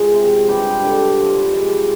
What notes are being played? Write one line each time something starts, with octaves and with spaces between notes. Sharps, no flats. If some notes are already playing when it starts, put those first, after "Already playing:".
Already playing: F3 G#3 G#4 C5
C3
G2 G4 B4
D3
F3
G#3